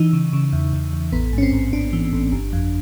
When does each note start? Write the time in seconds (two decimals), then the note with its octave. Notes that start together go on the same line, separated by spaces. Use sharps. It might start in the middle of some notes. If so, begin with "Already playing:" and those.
Already playing: E3 D#4
0.13 C#3
0.33 C#3
0.53 E2
0.73 E2
0.93 E2
1.12 A1 B3
1.33 G#2 C#4
1.43 C4
1.53 A1
1.73 A1 D4
1.93 E3
2.13 A1
2.32 G1
2.53 F2